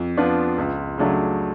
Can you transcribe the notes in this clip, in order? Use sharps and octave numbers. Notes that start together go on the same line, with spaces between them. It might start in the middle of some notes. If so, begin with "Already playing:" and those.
Already playing: F2
F3 B3 D4 F4
C#2
C#3 F#3 A3 D4